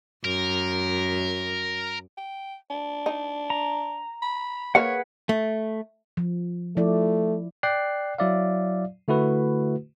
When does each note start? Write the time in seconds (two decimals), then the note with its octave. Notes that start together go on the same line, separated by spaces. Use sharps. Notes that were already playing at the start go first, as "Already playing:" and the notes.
0.25 F#2 A#4
2.17 G5
2.70 D4
3.06 D#4
3.50 A#5
4.22 B5
4.75 A#3 G#4 B4 C#5 F5 F#5
5.29 A3
6.17 F3
6.77 F3 A3 E4 D5
7.63 D5 G5 F#6 C7
8.18 F#3 E4 D5 E5 F5
9.08 D3 A3 E4 F#4 B4